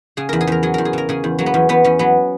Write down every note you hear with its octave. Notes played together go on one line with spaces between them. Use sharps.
C#3 G#4
E2 A#4
G#4
E2 A#4
F#3 G#4
E2 A#4
G#4
C#3 A#4
C#3 G#4
E2
F#3 A#3
B3
E2 C#4
E2 B3
E2 C#4
F#3 B3